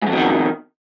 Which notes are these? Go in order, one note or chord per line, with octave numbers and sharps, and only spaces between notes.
F2 G#2 B2 D#3